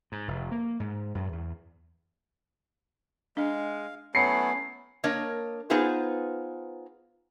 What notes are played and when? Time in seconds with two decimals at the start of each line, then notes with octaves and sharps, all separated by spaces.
0.12 G#2
0.28 F1
0.51 A#3
0.80 G#2
1.15 F#2
1.32 E2
3.37 G#3 D4 F5
4.15 F#3 A3 B3 C#4 E4 C7 C#7
5.04 A#3 D4 A#4 C#5 D#5
5.70 B3 D#4 F4 G#4 B4 C5